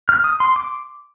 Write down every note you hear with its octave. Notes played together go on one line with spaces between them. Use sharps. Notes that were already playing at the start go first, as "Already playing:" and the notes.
F6
D#6
C6
D6